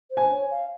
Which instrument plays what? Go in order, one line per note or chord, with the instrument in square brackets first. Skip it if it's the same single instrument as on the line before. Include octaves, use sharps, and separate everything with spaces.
[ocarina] C5
[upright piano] G#5
[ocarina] C#5
F5